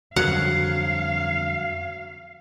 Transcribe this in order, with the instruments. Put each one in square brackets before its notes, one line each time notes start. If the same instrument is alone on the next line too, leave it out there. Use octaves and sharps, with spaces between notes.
[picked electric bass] F2 D3 G3 [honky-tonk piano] F#3 [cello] F5 [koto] F#5